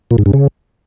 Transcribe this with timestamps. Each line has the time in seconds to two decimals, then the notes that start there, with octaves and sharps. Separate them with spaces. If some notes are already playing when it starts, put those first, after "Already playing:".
0.11 A#2
0.18 G#2
0.26 G2
0.33 C#3